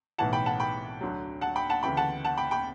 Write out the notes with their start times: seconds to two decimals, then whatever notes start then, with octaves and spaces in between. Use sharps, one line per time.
0.18 B1 A2 E3 F#5 A5
0.33 G5 B5
0.46 F#5 A5
0.60 G5 B5
1.01 D2 D3 F#3
1.41 F#5 A5
1.56 G5 B5
1.70 F#5 A5
1.83 D2 C#3 E3 G5 B5
1.97 F#5 A5
2.25 F#5 A5
2.37 G5 B5
2.51 G5 B5